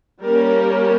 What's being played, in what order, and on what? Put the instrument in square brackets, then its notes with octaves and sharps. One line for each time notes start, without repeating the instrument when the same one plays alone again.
[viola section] G3 A#3 C#4 A#4